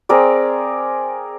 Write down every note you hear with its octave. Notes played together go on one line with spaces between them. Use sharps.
C4 G#4 A#4 D5